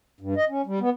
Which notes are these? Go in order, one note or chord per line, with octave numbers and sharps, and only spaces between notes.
G2
D#5
C#4
G3
B3